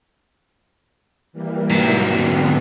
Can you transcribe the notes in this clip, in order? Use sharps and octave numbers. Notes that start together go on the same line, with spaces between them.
E3 G3 A#3
G#2 F#3
D3 B3